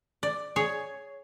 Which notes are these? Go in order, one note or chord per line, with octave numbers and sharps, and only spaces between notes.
D5
G#4 C#5